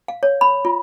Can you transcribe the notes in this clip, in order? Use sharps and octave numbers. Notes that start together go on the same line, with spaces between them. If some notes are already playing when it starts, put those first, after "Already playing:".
F5
C#5
B5
F4